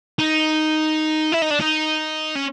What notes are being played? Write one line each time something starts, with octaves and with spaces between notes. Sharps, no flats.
D#4
E4
D#4
D4
D#4
C#4